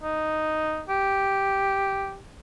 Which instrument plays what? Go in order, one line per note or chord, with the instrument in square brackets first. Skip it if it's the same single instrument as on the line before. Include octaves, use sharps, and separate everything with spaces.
[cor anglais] D#4
G4